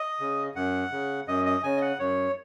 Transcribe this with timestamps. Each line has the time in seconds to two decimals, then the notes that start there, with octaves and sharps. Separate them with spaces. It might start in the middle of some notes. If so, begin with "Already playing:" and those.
Already playing: D#5
0.20 C#3
0.55 F#2 F#5
0.92 C#3
1.28 F#2 D#5
1.46 D#5
1.63 C#3 G#5
1.77 D#5
1.82 F#5
1.99 F#2 C#5